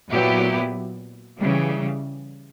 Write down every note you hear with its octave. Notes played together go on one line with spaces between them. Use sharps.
A#2 F#3 B3 E4 G4
C#3 E3 G3